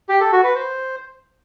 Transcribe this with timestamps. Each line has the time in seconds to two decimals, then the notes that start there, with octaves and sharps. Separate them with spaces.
0.09 G4
0.21 A4
0.32 F#4
0.44 B4
0.55 C5